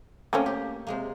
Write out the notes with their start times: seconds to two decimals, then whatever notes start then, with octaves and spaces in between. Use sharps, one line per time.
0.33 A3 A#3 C4 C#4 C#5 D#5
0.46 G4
0.87 C3 G#3 A#3